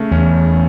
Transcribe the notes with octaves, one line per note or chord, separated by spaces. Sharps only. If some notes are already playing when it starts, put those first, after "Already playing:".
Already playing: C#3 A3
E2 C#4